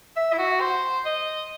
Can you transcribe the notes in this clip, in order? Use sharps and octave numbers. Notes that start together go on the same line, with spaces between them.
E5
E4
F#4
C5
D#5